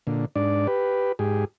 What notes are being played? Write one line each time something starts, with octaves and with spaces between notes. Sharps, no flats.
A#2 D3
G#2 D4 D5
G4 B4
G#2 G4 G#4